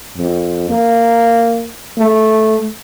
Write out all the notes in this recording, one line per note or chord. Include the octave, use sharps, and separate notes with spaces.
F2
A#3
A3